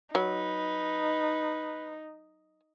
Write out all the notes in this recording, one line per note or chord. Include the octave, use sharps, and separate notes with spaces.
F#3 D#4 B4